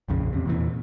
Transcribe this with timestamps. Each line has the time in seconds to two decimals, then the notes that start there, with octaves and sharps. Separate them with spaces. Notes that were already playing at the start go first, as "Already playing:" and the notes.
0.08 A#1 F2 C#3
0.33 E2 C3
0.46 E2 A#2 E3